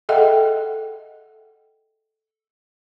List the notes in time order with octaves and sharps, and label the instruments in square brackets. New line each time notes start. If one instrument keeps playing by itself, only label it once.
[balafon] G#4 A4 D#5 E5 F#5 G5